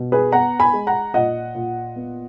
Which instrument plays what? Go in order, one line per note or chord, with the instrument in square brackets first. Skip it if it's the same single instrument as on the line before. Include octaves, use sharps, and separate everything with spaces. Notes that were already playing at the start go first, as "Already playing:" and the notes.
Already playing: [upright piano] B2
G#4 B4
B3 F#5 A#5
G#5 B5
G#3
F#5 A#5
A#2 D#5 F#5
A#2
B3